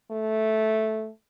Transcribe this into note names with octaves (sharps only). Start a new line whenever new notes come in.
A3